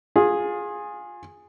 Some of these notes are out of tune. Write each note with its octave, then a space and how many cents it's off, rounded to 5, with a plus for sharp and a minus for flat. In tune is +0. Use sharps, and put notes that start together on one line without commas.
F4 +25 G#4 -5